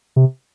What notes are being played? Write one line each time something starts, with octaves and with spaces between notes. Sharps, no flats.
C3